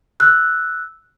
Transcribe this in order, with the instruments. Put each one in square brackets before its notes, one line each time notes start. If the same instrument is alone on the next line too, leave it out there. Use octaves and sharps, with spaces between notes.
[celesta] E6 F#6